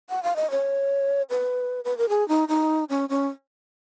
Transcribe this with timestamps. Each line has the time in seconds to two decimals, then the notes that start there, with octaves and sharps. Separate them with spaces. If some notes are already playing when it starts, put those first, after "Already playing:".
0.09 F#5
0.23 F5
0.36 D#5
0.51 C#5
1.30 B4
1.85 B4
1.98 A#4
2.09 G#4
2.29 D#4
2.48 D#4
2.89 C#4
3.09 C#4